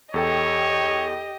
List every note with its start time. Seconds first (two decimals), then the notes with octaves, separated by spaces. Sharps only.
0.14 E2 G4 A4 C#5 D#5 G5